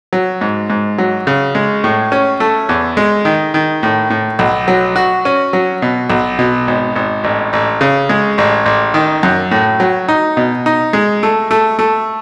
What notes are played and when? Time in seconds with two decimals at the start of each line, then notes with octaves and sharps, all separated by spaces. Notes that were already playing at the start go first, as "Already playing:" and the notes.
0.13 F#3
0.41 G#2
0.70 G#2
0.98 F#3
1.27 C#3
1.55 G#3
1.84 A2
2.12 C#4
2.40 A3
2.69 E2
2.97 G#3
3.25 D#3
3.54 D#3
3.83 A2
4.10 A2
4.39 B1
4.68 F#3
4.96 F#4
5.25 C#4
5.53 F#3
5.82 B2
6.10 B1
6.39 B2
6.67 G#1
6.95 G#1
7.24 A1
7.53 A1
7.81 C#3
8.09 G#3
8.38 A1
8.66 A1
8.94 D#3
9.23 F#2
9.51 A2
9.80 F#3
10.08 D#4
10.37 B2
10.66 D#4
10.93 G#3
11.23 A3
11.51 A3
11.79 A3